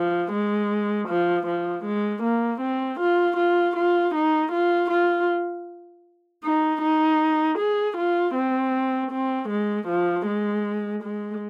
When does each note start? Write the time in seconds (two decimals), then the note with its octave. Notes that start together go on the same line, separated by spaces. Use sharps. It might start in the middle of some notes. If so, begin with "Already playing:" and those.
Already playing: F3
0.32 G#3
1.08 F3
1.47 F3
1.85 G#3
2.23 A#3
2.61 C4
3.00 F4
3.37 F4
3.76 F4
4.15 D#4
4.52 F4
4.91 F4
6.44 D#4
6.82 D#4
7.58 G#4
7.97 F4
8.35 C4
9.11 C4
9.49 G#3
9.88 F3
10.26 G#3
11.03 G#3